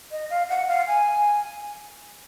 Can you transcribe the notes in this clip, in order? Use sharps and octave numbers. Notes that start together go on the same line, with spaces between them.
D#5
F5
F#5
F5
G#5